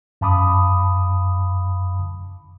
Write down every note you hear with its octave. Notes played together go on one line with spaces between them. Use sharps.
F#2 F5 A5 B5 D6 D#6